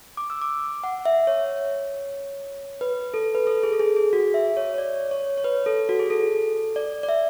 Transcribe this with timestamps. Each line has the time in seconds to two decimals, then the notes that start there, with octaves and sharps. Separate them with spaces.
0.17 D6
0.30 E6
0.42 D6
0.84 F#5
1.05 E5
1.27 C#5
2.81 B4
3.14 A4
3.35 B4
3.47 A4
3.63 G#4
3.73 A4
3.79 G#4
3.96 G#4
4.13 F#4
4.34 E5
4.57 C#5
4.74 C#5
4.78 D5
5.11 C#5
5.37 C#5
5.44 B4
5.66 A4
5.89 F#4
5.99 G#4
6.10 A4
6.76 D5
7.03 D5
7.09 E5